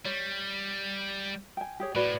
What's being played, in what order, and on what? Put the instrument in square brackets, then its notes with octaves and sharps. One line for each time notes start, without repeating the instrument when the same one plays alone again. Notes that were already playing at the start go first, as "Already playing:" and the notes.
[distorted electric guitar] G3 [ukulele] C#5
[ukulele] G5 G#5
G4 G#4 C#5
[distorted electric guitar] A2 [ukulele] F#4 B4 D5